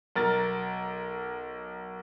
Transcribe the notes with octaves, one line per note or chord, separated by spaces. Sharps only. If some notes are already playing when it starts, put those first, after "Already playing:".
B1 A#4 A6